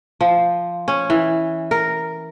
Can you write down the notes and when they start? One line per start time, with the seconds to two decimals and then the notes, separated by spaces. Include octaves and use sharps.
0.21 F3
0.88 C#4
1.10 E3
1.71 A#4